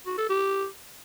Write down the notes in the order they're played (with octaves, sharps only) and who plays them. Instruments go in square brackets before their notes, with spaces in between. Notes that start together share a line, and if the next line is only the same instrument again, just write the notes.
[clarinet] F#4
A4
G4